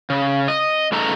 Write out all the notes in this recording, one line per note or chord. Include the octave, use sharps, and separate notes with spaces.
C#3
D#5
G2 C#3 A3 D#4 A4 A#5